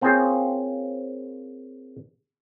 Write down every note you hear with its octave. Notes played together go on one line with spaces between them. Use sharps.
A#3 C4 C#4 F4 G#4 C5